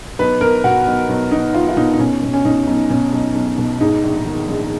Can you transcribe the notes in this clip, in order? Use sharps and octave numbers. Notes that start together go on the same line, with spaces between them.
B1 B4
B1 A#4
B2 F#4
B1
B1
B1 D#4
B1 F4
F4
B2 D#4
D#4
B2 C#4
B2
C#4
B2 D#4
B1
B2 C#4
B1
B1
B2
G#2 D#4
A#1
D#3
A#1